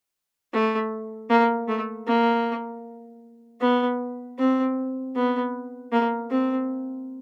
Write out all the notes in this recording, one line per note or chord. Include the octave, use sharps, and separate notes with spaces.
A3
A#3
A3
A#3
B3
C4
B3
A#3
C4